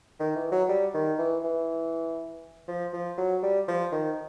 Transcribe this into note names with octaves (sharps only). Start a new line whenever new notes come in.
D#3
E3
F#3
G3
D#3
E3
E3
F3
F3
F#3
G3
F3
D#3